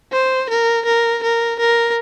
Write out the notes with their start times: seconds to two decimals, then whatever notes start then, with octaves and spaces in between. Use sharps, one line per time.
0.13 C5
0.50 A#4
0.85 A#4
1.23 A#4
1.59 A#4